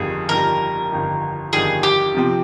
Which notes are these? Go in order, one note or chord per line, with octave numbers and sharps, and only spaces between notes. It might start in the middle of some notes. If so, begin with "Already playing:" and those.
Already playing: G1 F2 D#3 G3 G#4
G1 F2 D#3 G3 A#4
G1 F2 D#3 G3
G1 F2 D#3 G3 G#4
G4
C3 F3 C4